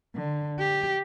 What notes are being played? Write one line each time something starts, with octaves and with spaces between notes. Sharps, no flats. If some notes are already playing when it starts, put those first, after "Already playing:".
D3
G4